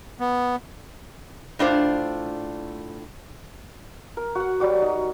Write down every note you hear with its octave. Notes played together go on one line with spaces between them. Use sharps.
B3
A2 D4 F4 C5
A#4
F#4 F#5
F#3 G3 F#4 D6
D#4